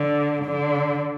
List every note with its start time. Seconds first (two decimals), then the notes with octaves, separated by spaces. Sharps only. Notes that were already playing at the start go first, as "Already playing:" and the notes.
Already playing: D3
0.45 D3